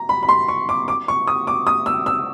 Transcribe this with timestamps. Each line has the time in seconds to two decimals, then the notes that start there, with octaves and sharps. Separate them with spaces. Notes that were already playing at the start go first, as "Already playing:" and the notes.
Already playing: A#5
0.09 B5
0.23 B5
0.29 C6
0.48 C#6
0.69 D6
0.88 D6
1.08 C#6
1.27 D#6
1.47 D6
1.67 D#6
1.86 E6
2.06 E6